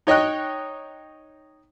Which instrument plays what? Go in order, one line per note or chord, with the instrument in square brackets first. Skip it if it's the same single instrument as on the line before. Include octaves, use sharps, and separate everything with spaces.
[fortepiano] D#4 C#5 D#5 G5 F#6